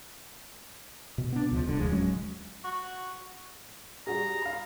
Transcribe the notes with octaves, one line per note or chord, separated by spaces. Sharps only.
B2
B3 D4
C#2 F3
D#1 C2 B2 D3
G1 D#2 F3 G#3
D1 F#3 G#3 C#4
F#4
G3 F#4 G#4 A#5
F5 B5